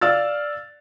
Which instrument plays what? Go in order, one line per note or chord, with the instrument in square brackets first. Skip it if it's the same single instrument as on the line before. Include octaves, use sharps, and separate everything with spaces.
[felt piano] D5 F5 E6 F6 A6